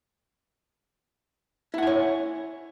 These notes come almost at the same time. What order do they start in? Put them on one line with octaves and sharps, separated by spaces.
E4 F#5 G#5 C#5